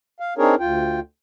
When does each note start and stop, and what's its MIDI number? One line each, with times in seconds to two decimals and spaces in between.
0.20 0.34 77
0.38 0.55 60
0.38 0.55 62
0.38 0.55 63
0.38 0.55 68
0.38 0.55 70
0.38 0.55 73
0.60 1.00 38
0.60 1.00 65
0.60 1.00 79